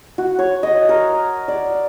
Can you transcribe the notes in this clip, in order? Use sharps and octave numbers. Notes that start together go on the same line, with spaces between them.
F#4
C#5
D#5
A#4
D5